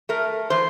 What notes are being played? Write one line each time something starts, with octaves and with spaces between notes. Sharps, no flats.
A3 A#4
E3 C5